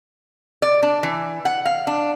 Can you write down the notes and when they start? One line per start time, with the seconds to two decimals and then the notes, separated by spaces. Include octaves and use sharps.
0.62 D5
0.83 D4
1.03 E3
1.45 F#5
1.65 F5
1.87 D4